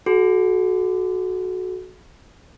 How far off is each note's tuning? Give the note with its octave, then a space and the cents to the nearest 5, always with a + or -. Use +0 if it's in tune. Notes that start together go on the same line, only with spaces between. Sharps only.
F#4 +0 A4 -45